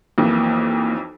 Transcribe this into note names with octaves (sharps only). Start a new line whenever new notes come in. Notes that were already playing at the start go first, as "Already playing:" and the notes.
B1 F2 E3 A#3